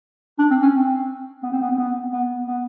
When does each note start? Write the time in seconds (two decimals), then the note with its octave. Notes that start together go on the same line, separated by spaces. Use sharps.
0.39 D4
0.50 C4
0.62 C#4
0.73 C4
1.43 B3
1.52 C4
1.61 B3
1.70 C4
1.78 B3
2.12 B3
2.47 B3